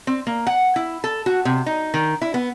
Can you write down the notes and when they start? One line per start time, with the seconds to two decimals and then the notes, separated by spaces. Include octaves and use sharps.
0.07 C4
0.27 A#3
0.47 F#5
0.76 E4
1.04 A4
1.26 F#4
1.45 C3
1.66 D#4
1.94 D#3
2.22 E4
2.34 B3